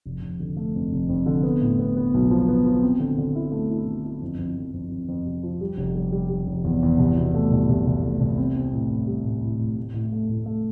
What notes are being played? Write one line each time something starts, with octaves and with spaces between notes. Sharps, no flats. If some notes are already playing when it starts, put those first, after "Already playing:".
F1
F1
D3
A3
F2
F1
F2
D3
B3
A2
B3
B3
B1
F3
B3
F3
C4
D3
D3
E4
A3
E4
D3
E4
F2
F2
F2
F2
F2
F2
C3
F3
G3
F1
G3
G3
G3
F1
E2
E2
C2
B2
A3
C2
C2
C2
A3
C2
C4
C4
A2
A2
G3
A2
A2
A2
A2
A2
A3
A2
A3